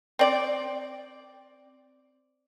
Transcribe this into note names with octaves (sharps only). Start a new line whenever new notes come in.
C4 D5